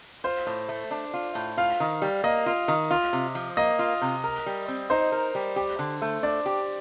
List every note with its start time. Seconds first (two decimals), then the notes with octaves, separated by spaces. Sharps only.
0.24 F4 C5
0.47 A2
0.69 A3
0.91 D4
1.14 F4
1.35 A2
1.57 F4 F5
1.80 D#3
2.02 G3
2.24 A#3 D#5
2.46 F4
2.68 D#3
2.91 F4
3.13 C3
3.35 F3
3.57 A#3 D#5
3.79 F4
4.01 C3
4.24 A#4
4.46 G3
4.68 C4
4.90 D#4 C5
5.12 A#4
5.35 G3
5.56 G4
5.79 D3
6.02 A3
6.23 D4 D5
6.46 G4